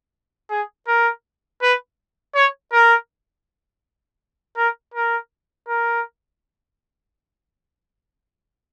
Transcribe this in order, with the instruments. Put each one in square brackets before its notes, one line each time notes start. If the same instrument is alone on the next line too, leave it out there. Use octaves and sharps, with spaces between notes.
[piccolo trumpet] G#4
A#4
B4
C#5
A#4
A#4
A#4
A#4